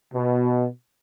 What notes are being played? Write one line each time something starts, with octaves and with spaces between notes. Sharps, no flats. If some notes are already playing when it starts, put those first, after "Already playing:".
B2